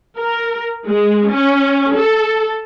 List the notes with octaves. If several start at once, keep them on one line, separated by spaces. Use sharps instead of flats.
A#4
G#3
C#4
A4